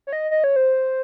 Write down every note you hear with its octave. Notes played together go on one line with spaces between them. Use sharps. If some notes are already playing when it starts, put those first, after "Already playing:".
C#5
D#5
D#5
C#5
C5